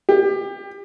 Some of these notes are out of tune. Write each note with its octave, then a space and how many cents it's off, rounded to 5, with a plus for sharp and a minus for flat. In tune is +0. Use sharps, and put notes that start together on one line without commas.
G4 +30